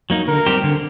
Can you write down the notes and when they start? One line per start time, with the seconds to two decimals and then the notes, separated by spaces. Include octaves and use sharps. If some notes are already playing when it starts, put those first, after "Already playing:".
0.10 F#3 A#3 D#4
0.28 D3 A#4
0.46 G3 C4 G4 C5
0.64 D3